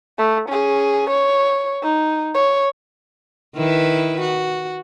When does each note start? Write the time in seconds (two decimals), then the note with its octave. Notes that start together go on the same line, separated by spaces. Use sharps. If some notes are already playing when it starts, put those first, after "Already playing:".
0.19 A3
0.49 C#4 G#4
1.09 C#5
1.83 D#4
2.34 C#5
3.55 D#3 E4 B4
4.21 F#4